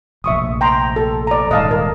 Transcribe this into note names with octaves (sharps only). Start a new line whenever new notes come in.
F1 A#1 E5 C#6 D#6
G5 A#5 C6
A4
D5 A#5
D#1 G#2 D#5 F5 A5
A#4